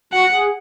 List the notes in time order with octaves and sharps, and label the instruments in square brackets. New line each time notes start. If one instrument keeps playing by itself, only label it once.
[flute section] F#4 [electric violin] F#5
[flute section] G#4